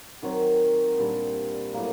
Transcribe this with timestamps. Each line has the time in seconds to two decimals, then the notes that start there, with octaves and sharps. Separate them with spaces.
0.22 D#3 F#3 C4
0.98 A#2 G3 D4
1.74 A2 F#3 A#3